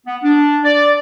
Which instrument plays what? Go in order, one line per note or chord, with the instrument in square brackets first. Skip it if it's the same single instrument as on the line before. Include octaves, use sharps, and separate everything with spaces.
[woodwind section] B3
D4
D5